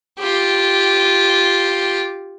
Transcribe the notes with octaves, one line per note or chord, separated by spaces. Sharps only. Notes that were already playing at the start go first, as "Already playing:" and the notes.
F4 G4